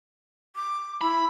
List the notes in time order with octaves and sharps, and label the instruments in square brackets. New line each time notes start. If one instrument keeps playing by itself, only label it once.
[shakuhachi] D6
[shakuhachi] E4 [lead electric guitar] B5